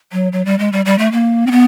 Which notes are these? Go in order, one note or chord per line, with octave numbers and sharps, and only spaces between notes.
F#3
F#3
G3
G#3
G3
G3
A3
A#3
C4
B3